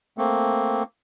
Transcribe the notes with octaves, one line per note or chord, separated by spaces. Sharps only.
A3 A#3 C4